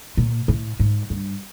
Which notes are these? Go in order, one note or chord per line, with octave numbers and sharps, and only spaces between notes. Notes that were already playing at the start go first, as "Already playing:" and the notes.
A#2
A2
G#2
G2